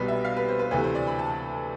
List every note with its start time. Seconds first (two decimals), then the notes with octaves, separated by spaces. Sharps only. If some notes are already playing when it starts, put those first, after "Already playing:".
Already playing: C2 B2 G3 B4
0.08 E5
0.25 F5
0.37 B4
0.48 C5
0.59 B4
0.71 D2 C3 E3 A3 B4
0.84 C5
0.95 D5
1.07 B5
1.19 A5